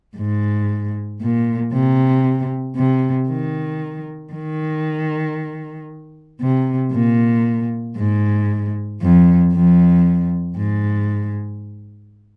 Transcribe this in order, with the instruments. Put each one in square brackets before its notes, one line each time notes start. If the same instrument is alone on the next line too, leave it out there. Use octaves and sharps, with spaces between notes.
[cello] G#2
A#2
C3
C3
D#3
D#3
C3
A#2
G#2
F2
F2
G#2